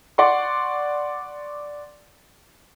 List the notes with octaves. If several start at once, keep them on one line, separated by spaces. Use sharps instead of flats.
D5 F#5 C6 C#6